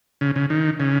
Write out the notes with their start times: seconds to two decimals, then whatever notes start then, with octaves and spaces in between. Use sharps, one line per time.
0.21 C#3
0.36 C#3
0.50 D#3
0.80 C#3